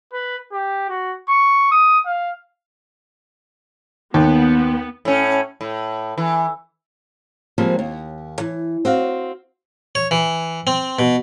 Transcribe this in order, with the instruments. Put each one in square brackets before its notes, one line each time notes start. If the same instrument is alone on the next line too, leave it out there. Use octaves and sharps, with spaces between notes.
[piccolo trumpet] B4
G4
F#4
C#6
D#6
F5
[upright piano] D#2 [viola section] B3
[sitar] A2 C#4
A2
E3
[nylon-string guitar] F3 G3 G#3 A#3 C4
D#2
E3
C4 F#4 F5
[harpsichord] C#5
E3
C4
B2